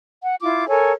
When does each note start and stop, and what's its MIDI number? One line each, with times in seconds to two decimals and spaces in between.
0.23 0.35 78
0.41 0.67 64
0.41 0.67 65
0.41 0.67 86
0.68 0.91 69
0.68 0.91 70
0.68 0.91 73
0.68 0.91 80